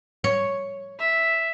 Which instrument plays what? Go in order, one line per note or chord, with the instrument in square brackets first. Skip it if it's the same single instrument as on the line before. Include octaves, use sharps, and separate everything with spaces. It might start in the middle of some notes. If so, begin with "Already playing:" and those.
[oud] C#5
[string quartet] E5